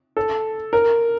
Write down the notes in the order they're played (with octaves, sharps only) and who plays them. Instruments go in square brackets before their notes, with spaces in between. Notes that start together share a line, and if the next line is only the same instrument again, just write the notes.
[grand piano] A4
A#4